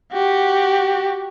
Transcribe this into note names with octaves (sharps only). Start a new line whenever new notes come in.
F#4 G4